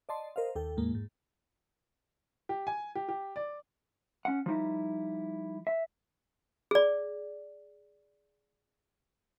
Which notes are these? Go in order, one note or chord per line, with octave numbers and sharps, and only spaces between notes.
D5 D#5 A5 C6
A#4 C5 D#5 F5
D#2 A4 G5
E2 A2 G#3 A#3
G#2
G4
G#5
G4
G4
D5
C#4 F#5
F3 G3 D#4 E4
E5
G#4 D5